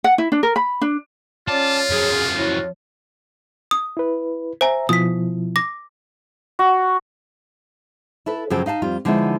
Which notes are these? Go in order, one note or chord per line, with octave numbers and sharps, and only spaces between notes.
F#5
E4
D4
A#4
B5
D4
C#4 F4 C#5 D5 A5
F#2 F3 G#4
E4 F#4 C#5
D#6
E4 B4
C5 E5 G#5 A#5
B2 F3 E4 D#6 B6
D6 A#6
F#4
E4 A4 B4
F#2 C#3 F3 F#4 A4 G5
D#4 F5 F#5 A5
F2 G3 F4
D3 F3 G#3 B3 D#4 E4